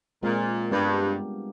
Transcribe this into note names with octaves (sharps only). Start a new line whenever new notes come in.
A#2 G#3 C4 F4 A#4
G2 G3 B3 D4 G4 A#4